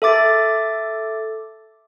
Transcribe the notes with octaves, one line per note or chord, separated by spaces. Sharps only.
A4 E5 D6 A6